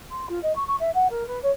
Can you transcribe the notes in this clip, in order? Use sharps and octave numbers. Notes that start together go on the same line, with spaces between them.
C6
F4
D#5
C#6
C#6
E5
F#5
A#4
B4
C#5